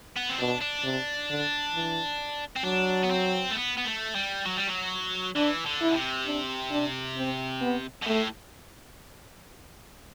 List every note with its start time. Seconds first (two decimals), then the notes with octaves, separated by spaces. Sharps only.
0.17 B3
0.30 C4
0.39 B2 D4
0.61 D4
0.84 C3
1.30 D3
1.74 E3
2.56 C4
2.65 F#3 D4
3.03 B3
3.10 C4
3.50 A3
3.55 B3
3.77 B3
3.85 A3
4.15 G3
4.45 F#3
4.57 G3
4.67 F#3
5.36 E3 D4
5.66 D3
5.81 E4
5.91 B2
5.96 C3
6.26 D4
6.71 D4
7.17 C4
7.61 B3
8.02 B2
8.07 A2 A3